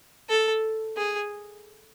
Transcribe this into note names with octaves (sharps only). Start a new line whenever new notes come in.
A4
G#4